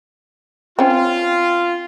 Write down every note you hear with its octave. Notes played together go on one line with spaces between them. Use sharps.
C4 C#4 F4